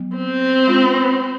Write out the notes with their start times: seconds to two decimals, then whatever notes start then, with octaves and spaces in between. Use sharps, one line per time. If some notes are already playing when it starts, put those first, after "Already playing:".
Already playing: F#3 B3
0.16 C4
0.67 G#3 C#4 F4